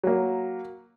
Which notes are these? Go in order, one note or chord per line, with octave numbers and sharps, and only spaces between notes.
F#3 A#3